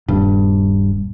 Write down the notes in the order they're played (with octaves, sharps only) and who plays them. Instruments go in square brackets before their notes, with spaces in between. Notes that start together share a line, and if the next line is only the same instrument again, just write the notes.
[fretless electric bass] D#1 [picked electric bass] G2